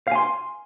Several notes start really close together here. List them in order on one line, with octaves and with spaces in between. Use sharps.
F5 G#5 C6